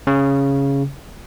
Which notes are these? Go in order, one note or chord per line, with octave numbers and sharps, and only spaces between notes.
C#3